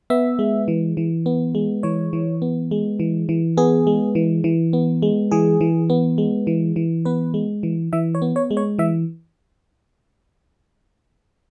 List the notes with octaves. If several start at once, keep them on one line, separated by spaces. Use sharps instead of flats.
B3 E5
G#3
E3
E3
B3
G#3
E3 C#5
E3
B3
G#3
E3
E3
B3 G#4
G#3
E3
E3
B3
G#3
E3 G#4
E3
B3
G#3
E3
E3
B3 B4
G#3
E3
E3 E5
C#5
B3
C#5
G#3
C#5
E3 E5